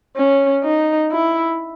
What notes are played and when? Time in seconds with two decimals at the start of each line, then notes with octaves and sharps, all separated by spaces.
0.16 C#4
0.64 D#4
1.12 E4